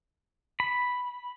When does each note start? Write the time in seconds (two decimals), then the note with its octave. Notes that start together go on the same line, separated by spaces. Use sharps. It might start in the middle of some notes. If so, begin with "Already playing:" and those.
0.60 B5